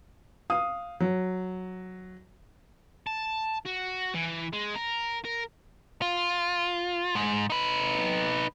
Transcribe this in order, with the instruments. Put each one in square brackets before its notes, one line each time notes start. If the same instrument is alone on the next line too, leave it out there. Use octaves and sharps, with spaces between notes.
[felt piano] F5 D#6
F#3
[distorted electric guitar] A5
F#4
E3
G#3
A#4
A#4
[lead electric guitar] F4
G#2
D#4 B4